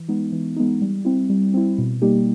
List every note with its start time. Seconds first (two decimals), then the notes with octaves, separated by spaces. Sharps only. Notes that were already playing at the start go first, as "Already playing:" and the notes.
Already playing: E3
0.09 G#3 B3 D#4
0.32 E3
0.56 G#3 B3 D#4
0.81 G3
1.05 C4 E4
1.30 G3
1.54 C4 E4
1.78 B2
2.02 G3 A#3 D#4 G4